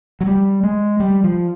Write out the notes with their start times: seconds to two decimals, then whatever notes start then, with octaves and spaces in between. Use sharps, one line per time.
0.21 F#3
0.27 G3
0.63 G#3
1.00 G3
1.24 F3